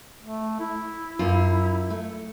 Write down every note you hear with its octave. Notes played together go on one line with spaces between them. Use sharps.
A3
E4
F#2 F4
A3